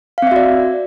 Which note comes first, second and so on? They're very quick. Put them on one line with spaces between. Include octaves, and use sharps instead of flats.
F5 C4 E5 F#4 D5